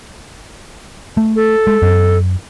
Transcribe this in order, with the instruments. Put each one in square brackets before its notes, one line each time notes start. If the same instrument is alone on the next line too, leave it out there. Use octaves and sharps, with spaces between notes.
[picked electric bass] A3
[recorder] A4
[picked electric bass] G#3
F#2